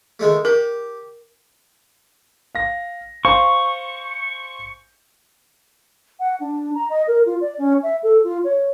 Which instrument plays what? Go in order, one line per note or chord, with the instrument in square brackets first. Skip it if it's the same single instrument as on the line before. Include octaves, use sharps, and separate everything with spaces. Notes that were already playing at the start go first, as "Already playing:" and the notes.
[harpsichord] D#3 G#3 A3
[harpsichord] G4 [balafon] A#4
[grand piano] F5 A#6
[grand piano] C5 F5 G#5 [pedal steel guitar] C#6
[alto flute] F#5
D4
A#5
D#5
A#4
F4
D5
C#4
E5
A4
F4
C#5